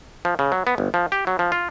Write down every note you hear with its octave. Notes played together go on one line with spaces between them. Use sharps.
F3
C#3
F#3
B3
G1
F3
G4
F#3
F3
F4